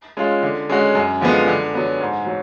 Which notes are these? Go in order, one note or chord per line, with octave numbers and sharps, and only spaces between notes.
G#3 C#4 F4
D3
G#3 C#4 F#4
F#2
D3 F3 G#3 B3
D3
F#3 B3
G#2
F#3